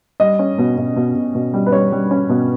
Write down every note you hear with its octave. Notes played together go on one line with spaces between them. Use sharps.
G3 D#5
C#4
B2
B2
B2
B2
B2
G3
B4
G3 C#5
G3
C#4
B2